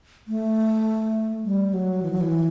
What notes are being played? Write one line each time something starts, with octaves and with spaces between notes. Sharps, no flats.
A3
G3
F#3
E3
F#3
E3